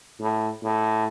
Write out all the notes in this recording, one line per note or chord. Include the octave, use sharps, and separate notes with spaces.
A2
A2